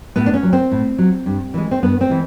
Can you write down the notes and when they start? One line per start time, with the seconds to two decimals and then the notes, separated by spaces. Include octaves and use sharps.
0.16 A2 B3
0.26 D4
0.34 C#4
0.43 F#3
0.53 C4
0.71 A2
0.98 F#3
1.26 G2
1.54 E3 G#3
1.71 C4
1.83 G2 B3
2.01 C4
2.09 E3 G#3